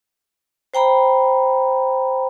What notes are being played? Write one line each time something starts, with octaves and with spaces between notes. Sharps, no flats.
C5 G5 A#5 B5